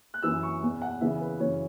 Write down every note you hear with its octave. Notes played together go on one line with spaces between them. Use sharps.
F#6
F#2 E3 E6
C#6
E2 B2
F#5
E2 C#3 E3 E5
B4
F#2 C#3 E3 C#5